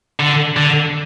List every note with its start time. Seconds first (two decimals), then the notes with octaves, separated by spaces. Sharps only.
0.20 D3
0.57 D3